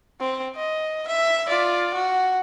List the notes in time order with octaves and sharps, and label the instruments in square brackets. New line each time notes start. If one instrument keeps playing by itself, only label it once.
[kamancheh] C4
D#5
E5
F4 D5
F#4